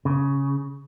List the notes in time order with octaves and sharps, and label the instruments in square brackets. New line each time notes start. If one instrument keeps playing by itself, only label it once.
[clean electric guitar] C#3